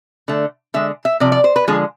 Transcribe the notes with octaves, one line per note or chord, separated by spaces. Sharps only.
D3 A3
D3 G#3 E5
E5
C3 F3 D5
D5
C5
B4
D3 F3 G#3 G#4